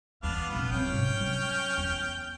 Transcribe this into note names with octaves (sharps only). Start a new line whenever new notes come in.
E2 B3 D4 F5
F1 A#1 B3 F4
F3 C4 C#4 G5 F6
G#2 C3
F#3
E2